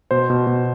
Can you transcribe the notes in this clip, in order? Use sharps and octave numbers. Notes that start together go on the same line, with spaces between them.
B2 C5
B2
B2